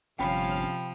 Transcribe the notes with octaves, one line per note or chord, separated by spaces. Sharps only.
G1 C3 F3 C#4 F5 G5 B5